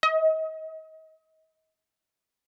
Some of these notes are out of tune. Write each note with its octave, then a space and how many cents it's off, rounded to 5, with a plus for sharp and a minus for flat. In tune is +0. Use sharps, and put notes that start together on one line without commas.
D#5 +35